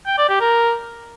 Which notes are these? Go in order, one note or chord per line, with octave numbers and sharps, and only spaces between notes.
G5
D5
G4
A#4